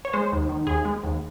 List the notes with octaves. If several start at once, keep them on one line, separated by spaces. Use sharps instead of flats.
C#5
G#3 C5
D#2
D#3
D#2 G#4
G#3
D#2